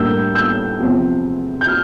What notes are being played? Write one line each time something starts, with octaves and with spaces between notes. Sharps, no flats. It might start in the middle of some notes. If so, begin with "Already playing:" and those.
Already playing: A2 G3 A#3 D4 E6 G6
E6 G6
E2 C3 F3 C4
G6
F6